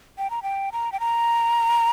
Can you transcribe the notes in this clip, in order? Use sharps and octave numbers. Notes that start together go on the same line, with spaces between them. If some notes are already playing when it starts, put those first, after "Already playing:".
G5
A#5
G5
A#5
G5
A#5